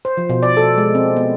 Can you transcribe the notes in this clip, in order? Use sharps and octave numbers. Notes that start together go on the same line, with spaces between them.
C5
F3
B2
D5
A4
G#3
C4
B3